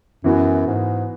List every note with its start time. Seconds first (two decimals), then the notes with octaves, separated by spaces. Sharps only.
0.24 F#2 E3 B3 F#4
0.67 G#2